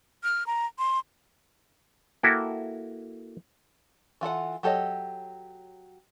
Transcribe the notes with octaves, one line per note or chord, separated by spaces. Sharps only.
F6
A#5
C6
A#3 E4 F#4 A4 G5
E3 F4 A4 F#5
F#3 G4 A4 C#5 D#5